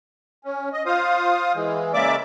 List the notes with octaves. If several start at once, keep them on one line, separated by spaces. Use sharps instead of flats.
C#4
D#5
F4 C5 F5 D#6
E3 G#3
C#3 G#3 A#3 D5 E5 D6